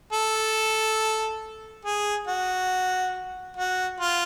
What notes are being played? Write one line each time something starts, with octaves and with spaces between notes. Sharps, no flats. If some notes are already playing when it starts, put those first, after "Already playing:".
A4
G#4
F#4
F#4
F4